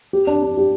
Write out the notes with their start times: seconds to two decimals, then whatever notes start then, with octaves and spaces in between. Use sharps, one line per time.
0.13 G4
0.27 D4
0.43 D4
0.57 G4